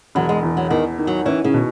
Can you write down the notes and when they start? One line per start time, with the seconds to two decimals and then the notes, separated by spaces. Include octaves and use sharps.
0.15 E1 F#3
0.29 G#3
0.43 E2
0.57 F#3
0.70 E2 D#3
0.98 D#3
1.07 F#3
1.25 E3 C#4
1.44 C#3
1.54 B2